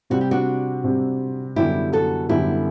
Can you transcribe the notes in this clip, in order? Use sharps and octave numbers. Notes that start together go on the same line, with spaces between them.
C3 G3 C4 F#4
G4
D4 F#4
C3 G3 C4
F#2 D3 G3 B3 E4 G4
F#4 A4
F#2 D3 G3 B3 E4 G4